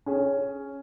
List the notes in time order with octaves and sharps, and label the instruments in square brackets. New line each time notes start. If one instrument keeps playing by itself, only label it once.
[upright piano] C#4 G#4